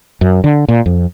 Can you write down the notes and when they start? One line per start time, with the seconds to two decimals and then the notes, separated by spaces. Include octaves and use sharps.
0.21 F#2
0.44 D3
0.68 A#2
0.86 F2